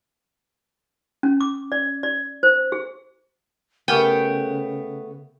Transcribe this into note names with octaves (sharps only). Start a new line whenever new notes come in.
C#4
D6
D5
D5
C5
G#4
C#3 A3 B3 G4 A#4 G5 G#5